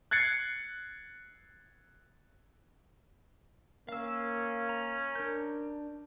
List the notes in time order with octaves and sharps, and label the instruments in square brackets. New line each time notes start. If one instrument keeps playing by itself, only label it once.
[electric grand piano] F#6 G#6 A6 C7 C#7
[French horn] A#3 [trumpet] C#4 [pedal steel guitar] F5 E6
[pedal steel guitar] A#5
[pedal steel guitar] D4 G6 [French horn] A#4